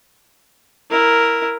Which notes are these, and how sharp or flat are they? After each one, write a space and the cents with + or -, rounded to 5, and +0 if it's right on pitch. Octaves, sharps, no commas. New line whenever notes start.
E4 +0 A#4 +0